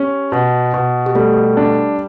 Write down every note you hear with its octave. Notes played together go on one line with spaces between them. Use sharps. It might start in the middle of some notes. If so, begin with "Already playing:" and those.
Already playing: C#4 G4
B2
B2
G4
G3 A3 A4
D4